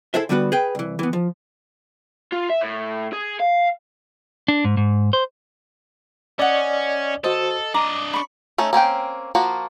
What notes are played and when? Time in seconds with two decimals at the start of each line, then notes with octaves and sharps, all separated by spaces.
0.14 E4 G#4 A4 C5 E5
0.29 D3 G3 B3 F#4 B4
0.52 G#4 B4 G5
0.75 C2 E3
0.99 E3 B3
1.13 F3
2.32 F4
2.50 E5
2.61 A2
3.13 G#4
3.40 F5
4.48 D4
4.65 G#2
4.77 G#2
5.13 C5
6.39 C#4 D5 D#5 F#5 D#6
7.24 F#4 A4 C5 D#5
7.74 D4 D#5 A#5 D6
8.13 B5 C#6
8.58 A3 C#4 D#4
8.73 A#3 C4 C#4 G5
9.35 F3 A#3 F#4